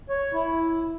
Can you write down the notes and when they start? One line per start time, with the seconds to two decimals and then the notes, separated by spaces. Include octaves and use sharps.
0.09 C#5
0.33 E4